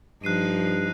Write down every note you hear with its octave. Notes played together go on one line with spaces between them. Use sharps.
G2 F3 D#4 F#6 C7 D#7